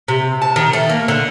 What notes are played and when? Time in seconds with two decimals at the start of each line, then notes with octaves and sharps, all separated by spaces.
0.08 C3
0.42 A5
0.56 D#3
0.73 A3
0.89 A#3
1.08 D3